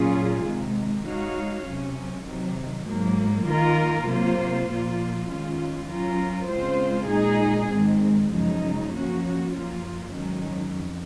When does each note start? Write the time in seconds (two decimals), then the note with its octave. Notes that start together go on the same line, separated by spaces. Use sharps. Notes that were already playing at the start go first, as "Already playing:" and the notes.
Already playing: A#2 F#3 C#4 F4 G#4
0.44 C3 D#3 G#3
1.05 G#3 D#4 F#4 C#5 F5
1.66 C3 F#3 C#4
2.26 C3 D#3 F#3
2.86 G#2 F#3 A#3
3.47 D#3 A#3 F4 A#4
4.08 C3 F#3 A#3 F4 C5
4.68 A#2 F3 A#3 F4
5.29 D#3 G#3 C#4 F4
5.89 F#3 C#4 F4 A#4
6.50 C#3 G#3 C4 F4 C5
7.10 A#2 G#3 D#4 G#4
7.72 G#2 D#3 G#3 C4
8.32 F#2 C#3 F3 G#3 D#4
8.93 F3 A#3 C#4 F#4
9.53 F#2 F3 A#3 F4
10.14 G#2 D#3 F#3 C#4
10.75 F2